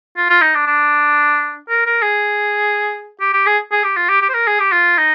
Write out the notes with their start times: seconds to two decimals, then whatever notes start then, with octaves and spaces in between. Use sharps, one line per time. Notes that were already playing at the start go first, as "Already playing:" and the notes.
0.17 F4
0.30 F4
0.41 D#4
0.55 D4
0.67 D4
1.69 A#4
1.86 A#4
2.02 G#4
3.20 G4
3.33 G4
3.46 G#4
3.72 G#4
3.84 G4
3.96 F4
4.09 G4
4.22 G4
4.29 C5
4.34 A#4
4.47 G#4
4.60 G4
4.72 F4
4.98 D#4